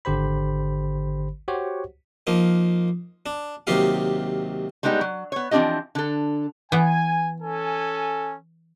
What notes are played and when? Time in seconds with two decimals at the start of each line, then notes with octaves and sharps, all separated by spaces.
0.05 G#1 D3 G4 C5 B5
1.48 F#4 G4 C5 C#5 F#5
2.27 F3 A#3 D#4
3.26 D4
3.67 D#2 C3 F#3 D#4 G4 F5
4.83 G3 G#3 B3 D#4 G4
5.01 F#3
5.32 B3 C#5
5.51 E3 F3 C4 D4 G4 D#5
5.95 D3 A4
6.72 E3 B3 G#5
7.42 C#4 A4 G#5